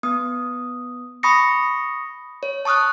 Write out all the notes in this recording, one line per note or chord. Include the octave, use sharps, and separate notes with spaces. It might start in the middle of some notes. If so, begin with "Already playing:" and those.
B3 D#6
B5 C#6 D#6 A#6 C#7
C#5
A5 C#6 D#6 F6 F#6